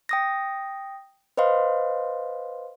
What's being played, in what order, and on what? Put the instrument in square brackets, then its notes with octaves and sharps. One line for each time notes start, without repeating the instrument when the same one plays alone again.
[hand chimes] G5 D#6 A#6
B4 C5 D#5 F5 C6